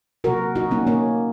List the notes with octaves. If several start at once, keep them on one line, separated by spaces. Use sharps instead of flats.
C3 F#3 A#3 F#4 A#4
D#4 F#4
A#3 C#4
A#3 C#4